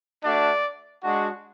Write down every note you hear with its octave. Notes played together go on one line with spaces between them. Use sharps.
A3 D4 F#4 D5
G#3 D4 F#4